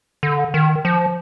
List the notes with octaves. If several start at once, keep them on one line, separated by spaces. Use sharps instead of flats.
D3
D#3
F3